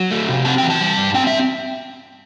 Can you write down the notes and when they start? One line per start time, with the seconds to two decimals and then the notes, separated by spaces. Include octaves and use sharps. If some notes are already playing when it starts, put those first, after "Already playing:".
Already playing: F#3
0.11 A3
0.29 C3
0.45 C4 A5
0.58 E3 G5
0.70 A5
0.80 G3
0.98 G2
1.14 C4 G5
1.27 E5